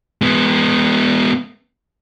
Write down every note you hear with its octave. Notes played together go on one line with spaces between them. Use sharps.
G#3 B3